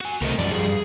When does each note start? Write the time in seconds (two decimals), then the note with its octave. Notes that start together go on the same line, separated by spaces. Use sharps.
0.01 F#4 G#5
0.21 C2 A3 C4 A#4 D#5
0.38 F#2 F3 G3 D5
0.50 G2 G#4